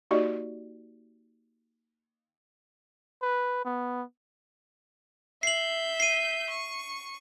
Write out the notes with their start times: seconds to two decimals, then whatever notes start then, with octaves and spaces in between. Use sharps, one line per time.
0.11 A#3 D#4 F#4 G4 D5 D#5
3.22 B4
3.65 B3
5.43 E5 G6 C7 F#7
6.00 C7 D#7
6.50 C#6